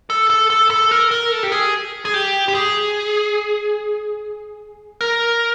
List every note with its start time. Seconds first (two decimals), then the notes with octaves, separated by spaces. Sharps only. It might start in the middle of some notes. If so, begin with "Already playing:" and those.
0.10 A4
0.30 A4
0.50 A4
0.70 A4
0.91 A#4
1.11 A#4
1.32 A4
1.43 G4
1.52 G#4
2.05 G#4
2.14 G4
2.48 G4
2.55 G#4
5.01 A#4